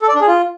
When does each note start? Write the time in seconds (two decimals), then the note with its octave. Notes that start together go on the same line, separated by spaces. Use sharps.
0.02 A4
0.08 D5
0.15 D4
0.21 G#4
0.27 F4